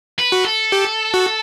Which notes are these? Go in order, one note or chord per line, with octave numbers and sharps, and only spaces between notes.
B4
F#4
A4
G4
F#4